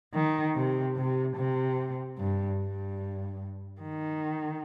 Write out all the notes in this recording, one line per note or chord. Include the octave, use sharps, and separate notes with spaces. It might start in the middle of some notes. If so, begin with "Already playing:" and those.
D#3
C3
C3
C3
G2
G2
D#3